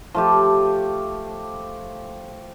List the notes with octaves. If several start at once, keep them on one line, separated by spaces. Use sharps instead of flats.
F3 A3 G4